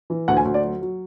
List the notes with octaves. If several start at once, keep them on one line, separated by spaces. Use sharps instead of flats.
E3
D2 F#5
G#5
D2
D5
F#3
F#3